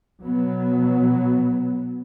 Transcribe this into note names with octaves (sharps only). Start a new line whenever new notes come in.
B2 F#3 B3